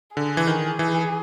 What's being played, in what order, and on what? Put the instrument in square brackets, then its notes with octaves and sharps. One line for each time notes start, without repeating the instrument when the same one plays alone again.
[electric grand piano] D3 [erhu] G#4
[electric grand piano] E3
D#3
E3